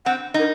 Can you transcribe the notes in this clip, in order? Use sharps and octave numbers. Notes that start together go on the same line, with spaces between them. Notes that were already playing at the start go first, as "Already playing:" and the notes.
C4 F#5
D#4 A#4